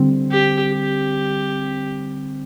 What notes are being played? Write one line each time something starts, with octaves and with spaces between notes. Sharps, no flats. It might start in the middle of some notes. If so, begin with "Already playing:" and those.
Already playing: D3 G3 C4
G4
G4